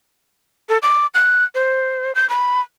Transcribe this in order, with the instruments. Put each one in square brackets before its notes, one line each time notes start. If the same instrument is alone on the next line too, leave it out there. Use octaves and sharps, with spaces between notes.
[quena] A4
D6
F#6
C5
G6
B5